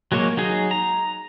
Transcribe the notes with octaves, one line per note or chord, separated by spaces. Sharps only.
F#3 G#3 A#3 C#5
F#3 D#4 G#4
A#5